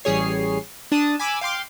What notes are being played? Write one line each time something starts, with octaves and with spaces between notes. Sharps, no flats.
A1 G3 G#4 C#5 C7
D4 A5 D#6
G#5 B5 D6 E6
F5 G5 C6 D6